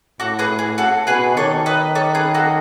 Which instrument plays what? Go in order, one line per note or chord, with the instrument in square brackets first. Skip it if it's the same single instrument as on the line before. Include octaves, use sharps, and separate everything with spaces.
[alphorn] A2 [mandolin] F#4 A4
[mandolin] G#4 B4
[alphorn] A2
[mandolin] G#4
F#4 A4
[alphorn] B2 [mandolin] G#4 B4
[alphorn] D#3 [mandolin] A4 C#5
[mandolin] B4 D#5
A4 C#5
G#4 B4
F#4 A4